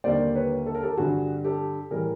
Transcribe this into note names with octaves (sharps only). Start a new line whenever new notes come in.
D#2 D3 G3 A#3 C5 D5
B4 C#5
A4
A#4
G4 A4
G2 D3 G3 C4 F#4 G#4
G4 A4
A2 E3 G3 G#4 A#4